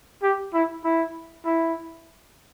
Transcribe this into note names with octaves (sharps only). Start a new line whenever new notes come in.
G4
E4
E4
E4